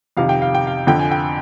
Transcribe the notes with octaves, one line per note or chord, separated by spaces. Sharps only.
F2 C3 D#3 F5
G5
F5
G5
F5
F2 D3 F3 G5
G#5
G5